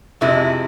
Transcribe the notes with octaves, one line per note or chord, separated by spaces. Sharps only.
F2 C3 F3 G#3 E4